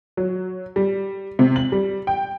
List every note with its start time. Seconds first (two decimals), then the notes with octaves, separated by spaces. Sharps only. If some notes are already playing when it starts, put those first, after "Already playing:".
0.17 F#3
0.76 G3
1.39 C3
1.56 F#7
1.72 G3
2.07 G5